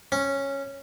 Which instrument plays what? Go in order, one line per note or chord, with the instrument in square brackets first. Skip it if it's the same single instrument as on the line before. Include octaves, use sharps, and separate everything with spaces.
[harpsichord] C#4